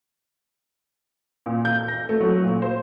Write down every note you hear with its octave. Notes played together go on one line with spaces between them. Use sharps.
A#2
G6
A#6
A3
F#3
A#2
C5